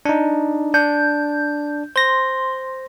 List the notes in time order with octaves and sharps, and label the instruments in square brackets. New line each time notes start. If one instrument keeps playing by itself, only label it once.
[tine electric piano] D4 D#4
[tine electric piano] D4 [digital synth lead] G6
[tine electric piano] C5 A#6 [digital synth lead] C6